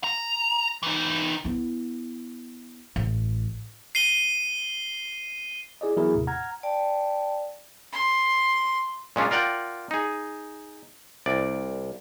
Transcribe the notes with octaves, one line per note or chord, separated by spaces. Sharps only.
A#5
E3 D#4
B3 E4
A1
C7 D#7 G7
E4 G#4 D5 D#5
E3 F#3 B3 E4 G#4 A#4
D#2 A2 C3
F#5 A#5 F6 G#6
D5 G5 A5
C6
A#2 G#3 C#4 D4 F4
F4 A#4 D5 F#5 G5
D#4 G#4
C2 D5